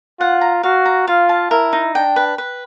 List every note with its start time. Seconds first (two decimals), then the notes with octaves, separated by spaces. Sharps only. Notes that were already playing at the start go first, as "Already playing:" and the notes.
0.20 F4 F#5
0.41 A#5
0.63 F#4 F5
0.85 A#5
1.07 F4 F5
1.29 A5
1.51 E4 A#4
1.73 D#4
1.95 D4 G5
2.16 B4
2.38 B4